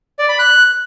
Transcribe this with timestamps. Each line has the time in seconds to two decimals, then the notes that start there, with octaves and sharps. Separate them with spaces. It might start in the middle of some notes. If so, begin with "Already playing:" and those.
0.19 D5
0.29 B5
0.39 F#6